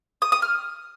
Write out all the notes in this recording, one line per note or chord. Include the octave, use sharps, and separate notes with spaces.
D#6
D#6
F6